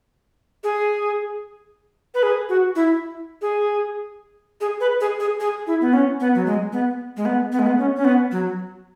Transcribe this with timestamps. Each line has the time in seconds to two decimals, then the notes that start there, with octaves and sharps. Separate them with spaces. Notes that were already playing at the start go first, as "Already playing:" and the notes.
0.64 G#4
2.14 B4
2.23 G#4
2.49 F#4
2.76 E4
3.42 G#4
4.61 G#4
4.80 B4
5.01 G#4
5.20 G#4
5.40 G#4
5.67 E4
5.81 B3
5.93 C#4
6.20 B3
6.35 F#3
6.46 G#3
6.72 B3
7.17 G#3
7.25 B3
7.52 B3
7.59 G#3
7.66 B3
7.78 C#4
7.96 C#4
8.05 B3
8.31 F#3